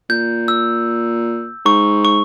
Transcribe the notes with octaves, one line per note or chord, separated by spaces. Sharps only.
A#2 G6
E6
G#2 C#6
C#6